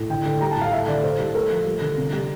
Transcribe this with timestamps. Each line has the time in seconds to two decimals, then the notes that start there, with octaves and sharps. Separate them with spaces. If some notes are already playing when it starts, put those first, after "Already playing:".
Already playing: A2
0.10 D3 G5
0.26 D3
0.41 G3 A#5
0.52 A2 A5
0.62 F5
0.72 A3 E5
0.88 D3 D5
1.03 A2 C5
1.19 G3
1.35 A3 A#4
1.50 F3
1.66 G3
1.82 D3
1.97 C3
2.13 G3